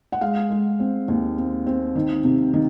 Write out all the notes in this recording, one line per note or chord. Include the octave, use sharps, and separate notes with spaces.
F#5
G#3 F5
G#3
C4
D#2
C4
C4
D#3
C3
D#3